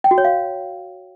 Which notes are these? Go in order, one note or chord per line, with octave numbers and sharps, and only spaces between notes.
G5
F#4
C#5
F5